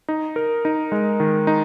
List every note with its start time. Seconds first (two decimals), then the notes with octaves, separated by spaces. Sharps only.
0.08 D#4
0.36 A#4
0.65 D#4
0.92 G#3
1.20 D#3
1.47 D#4